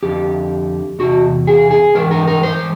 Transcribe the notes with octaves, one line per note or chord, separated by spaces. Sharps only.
F2 D3 G4
E2 C3 F#4
G#4
G#4
G#2 E3 A#4
A#4
A#4
C5